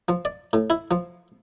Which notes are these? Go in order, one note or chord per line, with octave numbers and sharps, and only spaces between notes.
F3
D5
A2
E4
F3